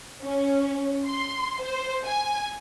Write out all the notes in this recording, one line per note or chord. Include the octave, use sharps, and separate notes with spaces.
C#4
C6
C5
G#5